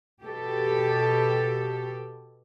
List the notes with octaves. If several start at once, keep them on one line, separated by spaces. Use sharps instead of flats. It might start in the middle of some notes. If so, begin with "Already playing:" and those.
B2 G4 A4